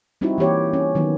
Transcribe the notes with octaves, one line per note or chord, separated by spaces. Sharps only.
G3 C4 D#4 E4 F#4
E3 A#3 G4 C#5
C#4
D#3 F#3 B3